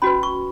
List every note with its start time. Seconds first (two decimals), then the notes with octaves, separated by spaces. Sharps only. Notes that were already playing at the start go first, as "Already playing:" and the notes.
0.02 C#4 F#4 B4 B5
0.23 C#6